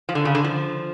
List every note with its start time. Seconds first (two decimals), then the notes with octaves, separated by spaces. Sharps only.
0.09 F3
0.15 D3
0.25 C#3
0.35 D3
0.44 F3